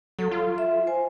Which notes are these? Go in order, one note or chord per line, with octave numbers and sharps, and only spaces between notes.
F#3 A4
F4
E5
C5 G#5